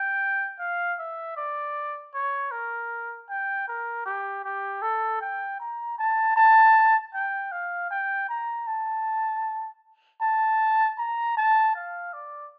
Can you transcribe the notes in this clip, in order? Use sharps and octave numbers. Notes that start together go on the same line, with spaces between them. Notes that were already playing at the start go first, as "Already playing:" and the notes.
Already playing: G5
F5
E5
D5
C#5
A#4
G5
A#4
G4
G4
A4
G5
A#5
A5
A5
G5
F5
G5
A#5
A5
A5
A#5
A5
F5
D5